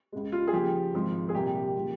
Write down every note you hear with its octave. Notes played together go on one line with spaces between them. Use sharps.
C#2 C#3 G#3
F4
G#4
D#2 C#3 F3 G4
G#1 G#2 F3
G#4
C2 A#2 G3 A#3 G4
G4
C#3 F3 A#3